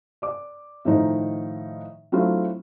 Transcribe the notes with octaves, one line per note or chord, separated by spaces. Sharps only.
D5 D6
A2 D#3 F3 D#4
F#3 A3 C4 D4 E4 F4